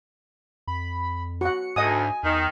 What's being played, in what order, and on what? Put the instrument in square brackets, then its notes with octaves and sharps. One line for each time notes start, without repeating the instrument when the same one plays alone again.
[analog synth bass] F2 [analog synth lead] B5
[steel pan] F#4 F#5 [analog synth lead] C#7
[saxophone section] D2 [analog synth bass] G#2 [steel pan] D#5 F#5 D#6 [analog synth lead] G#5
[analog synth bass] E2 [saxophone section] D#3